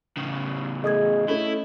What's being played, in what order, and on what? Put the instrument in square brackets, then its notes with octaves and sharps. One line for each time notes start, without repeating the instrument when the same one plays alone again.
[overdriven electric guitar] A2 C#3
[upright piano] A3 [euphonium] G#4 [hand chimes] D#5 D#6 G#6
[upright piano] A3 C#4 G7 [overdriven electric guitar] E4 [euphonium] A4